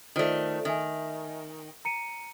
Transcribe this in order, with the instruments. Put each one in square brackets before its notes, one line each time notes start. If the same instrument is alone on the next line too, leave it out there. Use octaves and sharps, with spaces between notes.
[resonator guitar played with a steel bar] D#3 A3 [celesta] F4 C5 D5
[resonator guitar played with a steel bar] D#3 [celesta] D#5 E5 G#5
[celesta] A#5 C#7 D#7